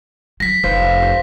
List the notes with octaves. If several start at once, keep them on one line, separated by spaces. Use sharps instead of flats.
F#3 A#6 B6
F1 F3 B4 C5
C5